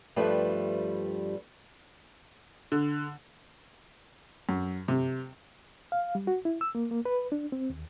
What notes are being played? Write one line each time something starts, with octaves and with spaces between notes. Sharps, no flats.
G2 F3 G3 A3 B4
D3
F#2
C3
F5
G3
F#4
E4
E6
A#3
A#3
B4
D4
C4
D#2